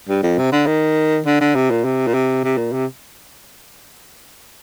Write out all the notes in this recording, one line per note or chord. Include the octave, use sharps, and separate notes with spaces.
G2
F2
C3
D3
D#3
D3
D3
C3
A#2
C3
A#2
C3
C3
A#2
C3